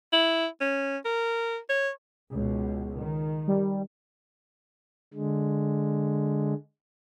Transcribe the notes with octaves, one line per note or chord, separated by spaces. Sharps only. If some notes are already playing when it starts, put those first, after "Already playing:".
E4
C#4
A#4
C#5
C#2 B2
D#3
G3
D3 G#3